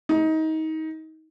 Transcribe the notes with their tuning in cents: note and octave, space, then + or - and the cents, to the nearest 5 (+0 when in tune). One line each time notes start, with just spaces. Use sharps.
D#4 +25